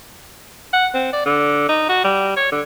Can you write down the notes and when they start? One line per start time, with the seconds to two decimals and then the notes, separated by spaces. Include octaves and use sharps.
0.73 F#5
0.94 C4
1.13 D5
1.26 D3
1.69 D#4
1.89 F#4
2.04 G3
2.36 C#5
2.52 D3